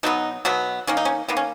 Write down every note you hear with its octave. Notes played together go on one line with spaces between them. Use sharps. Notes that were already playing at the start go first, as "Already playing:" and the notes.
B2 F#3 B3 D#4
B2 F#3 B3
D#3 A#3 C#4
D#4
C#4
D#3 A#3 B3
C#4